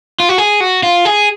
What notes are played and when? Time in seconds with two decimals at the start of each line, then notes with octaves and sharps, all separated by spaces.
0.20 F4
0.29 F#4
0.38 G#4
0.60 F#4
0.83 F4
1.05 G#4